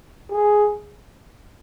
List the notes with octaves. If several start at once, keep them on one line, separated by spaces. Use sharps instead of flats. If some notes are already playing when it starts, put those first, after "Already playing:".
G#4